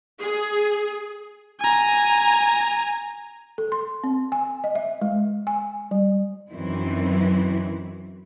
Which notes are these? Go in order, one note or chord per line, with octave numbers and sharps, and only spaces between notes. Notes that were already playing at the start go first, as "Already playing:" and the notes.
G#4
G#5 A#5
A4
C6
C4
G#5
D#5
E5
G#3
G#5
G3
F#2 D#3 E3 F#3 C4 E4